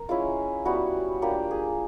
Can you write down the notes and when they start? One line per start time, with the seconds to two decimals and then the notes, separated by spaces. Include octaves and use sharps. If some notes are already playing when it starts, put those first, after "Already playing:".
Already playing: A#4
0.09 G#3 C#4 E4 F4
0.65 G3 B3 E4 F#4
1.22 A#3 D4 F4 G4
1.51 G#4